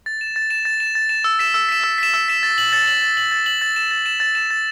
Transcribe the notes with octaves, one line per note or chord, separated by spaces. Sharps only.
A6
E7
A6
E7
A6
E7
A6
E7
E6
B6 E7
E6
B6 E7
E6
B6 E7
E6
B6 E7
A6
F#7
A6
F#7
A6
F#7
A6
F#7
A6
E7
A6
E7
A6
E7
A6